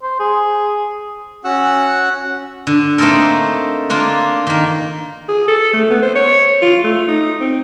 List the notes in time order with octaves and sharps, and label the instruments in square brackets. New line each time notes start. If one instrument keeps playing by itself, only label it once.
[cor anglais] C5
G#4
[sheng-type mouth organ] C#4 F#4 F#5 E6 F#6
[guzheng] D3
A3 A#3 C4 D#4 A4 A#4
D3 A#3 D4 F4
D#3 A#3
[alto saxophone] G#4
A4
A3
B3
C5
C#5
F4
A3
D#4
C4